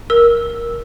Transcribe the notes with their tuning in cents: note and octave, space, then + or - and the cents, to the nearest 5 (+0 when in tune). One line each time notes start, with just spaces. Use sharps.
A#4 +15 E6 -5